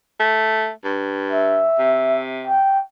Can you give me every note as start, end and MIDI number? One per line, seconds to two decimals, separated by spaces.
0.20 0.70 57
0.84 1.66 43
1.32 2.25 76
1.79 2.56 48
2.47 2.80 79